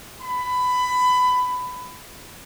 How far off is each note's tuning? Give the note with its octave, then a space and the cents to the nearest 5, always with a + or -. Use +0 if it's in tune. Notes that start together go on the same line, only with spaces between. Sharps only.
B5 +20